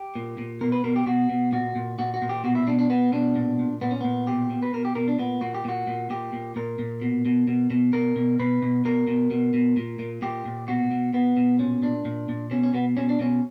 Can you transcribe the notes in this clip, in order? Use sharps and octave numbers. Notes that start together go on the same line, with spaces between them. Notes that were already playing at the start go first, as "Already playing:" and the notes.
Already playing: G4
A#2
A#2
B2 A#4
B4
B2 A#4
G4
B2 F#4
B2
A#2 F#4
A#2
A#2 F#4
F#4
A#2
G4
B2 F#4
E4
B2 D4
D4
B2 B3
B2 D4
A#2
A#2
A#2 B3
C#4
A#2 B3
B2 G4
B2
B4
B2 A#4
G4
B2 A#4
D4
A#2 B3
A#2 F#4
G4
A#2 F#4
A#2
A#2 G4
A#2
A#2 A#4
A#2
B2
B2
B2
B2
B2 A#4
B2
B2 B4
B2
B2 A#4
B2
B2
B2
A#2
A#2
A#2 G4
A#2
B2 F#4
B2
B2 B3
B2
A#2 C#4
A#2 D4
A#2
A#2
B2 C#4
C#4
B2 B3
B2 C#4
D4
B2 C#4